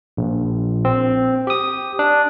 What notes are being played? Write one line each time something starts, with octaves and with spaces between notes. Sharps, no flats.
A#1
C4
G4 D#6
D4